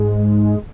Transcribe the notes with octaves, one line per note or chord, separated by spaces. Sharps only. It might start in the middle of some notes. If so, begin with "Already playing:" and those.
Already playing: G#2 G#3